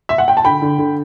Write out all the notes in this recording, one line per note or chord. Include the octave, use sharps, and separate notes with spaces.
E5
F#5
G5
A5
D3 G5 B5
D3
D3